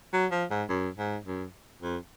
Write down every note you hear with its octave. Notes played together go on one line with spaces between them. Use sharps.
F#3
F3
G#2
F#2
G#2
F#2
F2